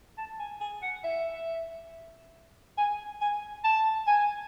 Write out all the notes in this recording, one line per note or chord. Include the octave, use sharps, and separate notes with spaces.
A5
G#5
G#5
F#5
E5
G#5
G#5
A5
G#5